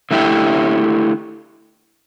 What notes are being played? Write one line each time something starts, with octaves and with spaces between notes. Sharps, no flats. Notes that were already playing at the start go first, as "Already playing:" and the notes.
D3 A3 E4 G4